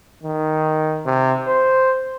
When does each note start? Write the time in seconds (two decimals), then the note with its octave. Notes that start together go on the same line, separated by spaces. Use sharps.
0.23 D#3
1.05 C3
1.47 C5